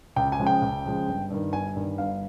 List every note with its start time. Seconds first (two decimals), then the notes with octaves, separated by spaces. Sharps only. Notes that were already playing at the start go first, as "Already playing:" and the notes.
0.16 C#2 G5
0.32 G#5
0.39 C#3 F3 G#3
0.47 G5
0.62 C#2
0.85 C#3 F3 G#3
1.08 G1
1.30 G2 D#3
1.53 G1 G#5
1.76 G2 D#3
1.98 G1 F5